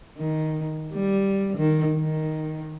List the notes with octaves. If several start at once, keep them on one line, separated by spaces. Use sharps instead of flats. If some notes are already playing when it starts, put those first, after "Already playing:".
D#3
G3
D#3
D#3